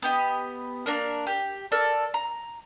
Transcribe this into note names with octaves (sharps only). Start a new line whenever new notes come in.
B3 G4 D#5
A#3 D4 A#4
G4
A4 A#4 D5
A#5